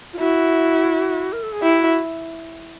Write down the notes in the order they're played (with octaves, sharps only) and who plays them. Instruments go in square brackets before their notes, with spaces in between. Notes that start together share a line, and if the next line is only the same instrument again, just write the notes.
[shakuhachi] F4
[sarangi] E4 [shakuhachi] F#4
[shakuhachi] A#4
A4
G#4
[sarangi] E4 [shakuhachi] G4
[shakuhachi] F#4